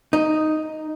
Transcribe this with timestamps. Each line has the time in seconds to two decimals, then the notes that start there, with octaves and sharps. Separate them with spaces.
0.13 D#4